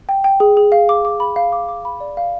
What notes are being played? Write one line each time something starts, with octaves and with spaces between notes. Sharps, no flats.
G5
G5
G#4
G#4
F5
D6
D6
B5
F5
D6
D6
B5
D5
F5